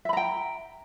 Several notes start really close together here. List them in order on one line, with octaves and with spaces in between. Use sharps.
E5 B5 A#5 G5